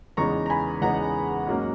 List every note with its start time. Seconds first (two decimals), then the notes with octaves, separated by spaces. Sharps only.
0.17 E2 C#3 G#3 B3 D#4 A#5 C#6
0.46 A#5
0.50 G#5 B5
0.81 E2 C#3 G#3 B3 D#4 F#5 A#5
1.47 G#2 F#3 A#3 C#4